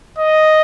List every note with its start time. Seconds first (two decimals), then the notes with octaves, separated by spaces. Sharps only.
0.18 D#5